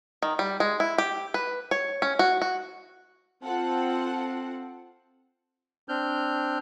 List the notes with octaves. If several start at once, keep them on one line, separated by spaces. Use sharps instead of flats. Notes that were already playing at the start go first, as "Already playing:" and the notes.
D#3
G3
G#3
E4
G4
B4
C#5
C#4
F#4
F#4
C4 F4 A4 F#5
C4 D4 F6 G6